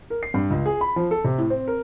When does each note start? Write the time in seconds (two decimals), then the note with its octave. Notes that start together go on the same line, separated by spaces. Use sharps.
0.10 A#4
0.23 C7
0.34 G2
0.50 C#2
0.66 G#4
0.81 B5
0.96 F3
1.11 A4
1.24 C3
1.38 A2
1.50 C4
1.68 A#4